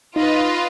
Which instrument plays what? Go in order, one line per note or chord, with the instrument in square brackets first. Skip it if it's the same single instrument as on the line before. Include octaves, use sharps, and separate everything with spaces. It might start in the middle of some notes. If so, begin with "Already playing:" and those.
[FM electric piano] D#4 [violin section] F4 B4 D#5